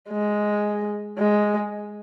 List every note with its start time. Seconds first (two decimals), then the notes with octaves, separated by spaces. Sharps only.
0.10 G#3
1.18 G#3